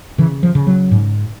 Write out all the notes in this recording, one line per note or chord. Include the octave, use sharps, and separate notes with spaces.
C#3 E3
F3
C#3
F#3
G#2